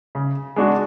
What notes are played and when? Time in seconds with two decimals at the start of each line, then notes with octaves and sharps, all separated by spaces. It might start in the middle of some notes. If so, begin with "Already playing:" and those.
0.15 C#3
0.56 G#3 D4 F#4